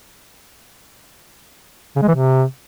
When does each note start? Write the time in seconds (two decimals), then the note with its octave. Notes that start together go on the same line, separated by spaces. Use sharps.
1.96 C#3
2.02 G#3
2.08 E3
2.14 C3